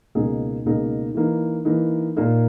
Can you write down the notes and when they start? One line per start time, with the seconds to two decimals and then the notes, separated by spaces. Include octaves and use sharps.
0.15 C#2 B2 A#3 D#4 G#4
0.65 C#2 B2 A#3 D#4 G#4
1.15 E3 A#3 D#4
1.65 E3 A#3 D#4
2.16 A#2 A#3 D#4